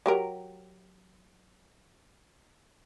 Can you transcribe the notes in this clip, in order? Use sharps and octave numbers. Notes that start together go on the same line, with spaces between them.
F#3 G4 A#4